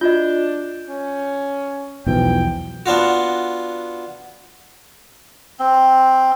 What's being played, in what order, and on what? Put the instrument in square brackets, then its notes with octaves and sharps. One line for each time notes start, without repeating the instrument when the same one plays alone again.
[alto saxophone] D4 [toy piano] F4 F#4 D#5 [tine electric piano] G6
[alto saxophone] C#4
[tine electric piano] B1 E3 F3 [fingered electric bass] E2 B2 [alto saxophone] G5
[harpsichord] B3 D4 F4 F#4
[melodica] C4